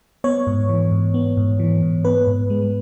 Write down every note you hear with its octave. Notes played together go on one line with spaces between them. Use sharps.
B3 C#5
G#2
E3
G#2
B3
G#2
E3
G#2
B3 B4
G#2
G#3